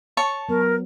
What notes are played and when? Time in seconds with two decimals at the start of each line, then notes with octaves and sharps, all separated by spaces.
0.17 C#5 A5 C#6
0.49 F#3 B3 A#4